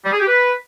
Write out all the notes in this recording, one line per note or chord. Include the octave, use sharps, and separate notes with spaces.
G3
G#4
G4
B4